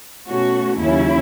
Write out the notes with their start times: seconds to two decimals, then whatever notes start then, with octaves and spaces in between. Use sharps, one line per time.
0.27 B2 A3 C#4 F#4
0.78 D#2 C#3 F#3 C#4 E4